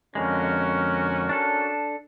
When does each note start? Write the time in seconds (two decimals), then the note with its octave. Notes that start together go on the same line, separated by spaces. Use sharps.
0.15 F2 D3 G#3 C#4 F#4 A#4
1.29 D4 A4